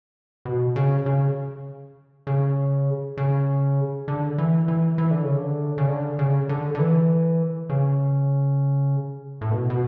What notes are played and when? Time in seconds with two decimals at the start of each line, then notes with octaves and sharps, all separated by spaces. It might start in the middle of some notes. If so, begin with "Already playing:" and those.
0.45 B2
0.76 C#3
1.06 C#3
2.27 C#3
3.17 C#3
4.08 D3
4.38 E3
4.68 E3
4.98 E3
5.11 D3
5.24 C#3
5.36 D3
5.78 C#3
5.88 D3
6.19 C#3
6.49 D3
6.75 D3
6.79 E3
7.70 C#3
9.41 A2
9.51 B2
9.70 B2